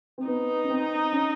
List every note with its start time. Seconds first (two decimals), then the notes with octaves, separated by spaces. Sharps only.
0.18 C4
0.26 B3 D#4
0.64 C#4
0.70 C4
1.13 C#4